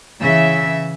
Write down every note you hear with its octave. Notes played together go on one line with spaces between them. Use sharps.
C#3 E3 E5